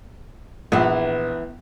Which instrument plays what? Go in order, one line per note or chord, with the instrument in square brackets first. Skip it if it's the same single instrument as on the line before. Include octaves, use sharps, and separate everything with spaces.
[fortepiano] A#1 [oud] E3 B3